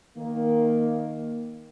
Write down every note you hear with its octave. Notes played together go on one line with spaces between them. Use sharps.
D#3 A#3